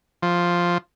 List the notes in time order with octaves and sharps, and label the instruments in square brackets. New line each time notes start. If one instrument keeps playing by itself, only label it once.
[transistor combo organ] F3